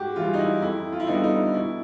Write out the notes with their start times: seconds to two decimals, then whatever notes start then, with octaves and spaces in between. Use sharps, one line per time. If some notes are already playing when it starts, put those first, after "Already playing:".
Already playing: G#2 F#4 G4
0.16 E3 G3 F4
0.34 D#4
0.39 E4
0.62 F2 E4
0.92 F4
1.00 E4
1.07 D3 G3 B3 D#4
1.14 E4
1.24 D#4
1.54 B2 E4